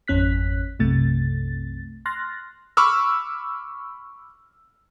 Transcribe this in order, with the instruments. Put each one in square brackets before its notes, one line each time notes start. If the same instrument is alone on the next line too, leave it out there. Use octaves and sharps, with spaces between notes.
[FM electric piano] G#1 F2 C#4 F#6 B6
B1 F#2 C3 A3 A6
C6 F6 F#6 A6 A#6
[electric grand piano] B5 C#6 D6 E6 F6